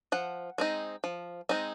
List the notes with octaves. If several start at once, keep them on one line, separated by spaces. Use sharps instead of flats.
F3 F#5
G#3 C4 D#4
F3
G#3 C4 D#4